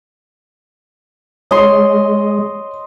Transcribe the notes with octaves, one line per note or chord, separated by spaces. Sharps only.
G#3 C#5 D#5 C6